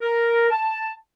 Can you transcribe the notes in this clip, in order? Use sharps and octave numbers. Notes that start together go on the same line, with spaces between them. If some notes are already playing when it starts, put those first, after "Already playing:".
A#4
A5